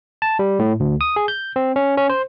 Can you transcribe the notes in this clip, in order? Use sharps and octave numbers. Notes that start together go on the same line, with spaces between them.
A5
G3
A2
D2
D#6
G#4
G6
C4
C#4
C#4
C5